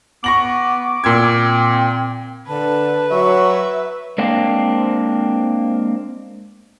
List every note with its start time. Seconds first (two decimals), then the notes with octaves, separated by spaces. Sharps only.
0.24 B3 C#6 D6 A#6 F#7
1.04 A#2 C4 E6 G#6
2.47 D3 B4 A5
3.11 F#3 E5 C#6
4.18 G#3 A#3 C4 D4 F5